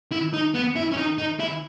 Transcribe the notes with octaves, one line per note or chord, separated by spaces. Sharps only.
E4
D#4
B3
E4
C#4
D#4
D#4
E4